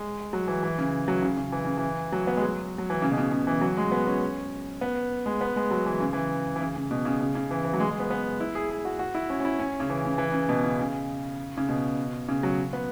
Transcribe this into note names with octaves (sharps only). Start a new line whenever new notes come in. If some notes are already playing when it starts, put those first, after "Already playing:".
Already playing: G#3
F#3
E3
E3
C#3
F#3
C#3
C#3
E3
C#3
E3
F#3
B3
G#3
F#3
F#3
E3
C#3
B2
C#3
C#3
E3
F#3
G#3
B3
C#4
B3
G#3
B3
G#3
F#3
E3
C#3
E3
E3
C#3
C#3
B2
C#3
C#3
C#3
E3
E3
F#3
G#3
G#3
B3
B3
E4
G#4
G#4
F#4
F#4
E4
C#4
C#4
E4
C#4
C#3
E3
C#3
E3
C#3
B2
C#3
C#3
C#3
B2
C#3
F#3
B3